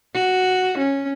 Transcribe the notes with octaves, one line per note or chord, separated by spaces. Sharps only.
F#4
C#4